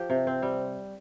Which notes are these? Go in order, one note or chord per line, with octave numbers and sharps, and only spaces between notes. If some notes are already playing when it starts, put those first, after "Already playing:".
Already playing: F3 G4
C3
C4
G3